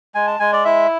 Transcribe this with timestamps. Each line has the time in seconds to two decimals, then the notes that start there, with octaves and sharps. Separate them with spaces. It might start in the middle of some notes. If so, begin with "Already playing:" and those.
0.15 G#3 G#5
0.27 A5
0.40 G#3 G#5
0.53 D5
0.65 E4 E5